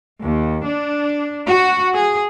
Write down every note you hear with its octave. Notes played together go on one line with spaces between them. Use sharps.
D#2
D4
F#4
G#4